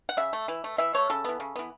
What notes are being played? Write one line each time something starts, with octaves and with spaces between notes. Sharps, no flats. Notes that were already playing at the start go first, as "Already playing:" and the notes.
F#5
C#3 E5
A3
E3
A3
E3 E5
A3 C#5
C#3 A4
E3 B3
C#3
E3 B3